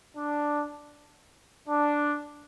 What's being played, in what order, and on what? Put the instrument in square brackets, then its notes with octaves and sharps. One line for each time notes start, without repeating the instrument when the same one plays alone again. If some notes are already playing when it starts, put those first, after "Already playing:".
[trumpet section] D4
D4